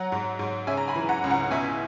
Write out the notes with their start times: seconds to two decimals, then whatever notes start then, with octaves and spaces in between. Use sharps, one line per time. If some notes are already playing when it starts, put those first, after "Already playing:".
Already playing: F#3 F#5 A#5
0.12 G#2
0.39 G#2
0.67 C#3 E5 G#5
0.77 A#5
0.88 G#5 B5
0.96 E3
1.09 F#5 A#5
1.24 C#2
1.30 F#5 A#5
1.51 B2 E5 G#5